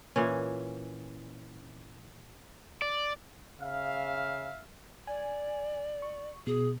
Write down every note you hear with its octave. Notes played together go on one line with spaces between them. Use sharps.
A#2 E3 C#4
D5
C#3 E5 F5
D5 G#5
C#6
B2 G#4